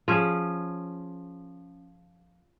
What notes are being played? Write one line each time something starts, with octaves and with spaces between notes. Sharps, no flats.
F3 C#4 G#4